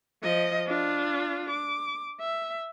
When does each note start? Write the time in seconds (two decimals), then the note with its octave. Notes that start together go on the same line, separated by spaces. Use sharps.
0.23 F3 D#5
0.67 D4 F4
1.50 D6
2.20 E5